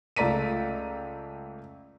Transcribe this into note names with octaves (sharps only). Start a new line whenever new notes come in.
C#2 A3 D5 A#5 B6 D#7